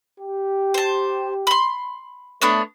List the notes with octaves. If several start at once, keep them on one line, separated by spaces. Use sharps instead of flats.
G4
C5 A5
B5 C6
A3 B3 D4 C#5